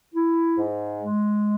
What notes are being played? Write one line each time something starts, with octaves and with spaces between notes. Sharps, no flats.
E4
G#2
G#3